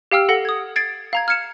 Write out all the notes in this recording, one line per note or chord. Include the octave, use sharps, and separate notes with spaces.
G4 F5 G5 E6 F6
A4 F#5 A#6 G7
D#6 G#6
G#6 A6 C7 D7
F5 A#5 G#6
F6 G#6 C#7 E7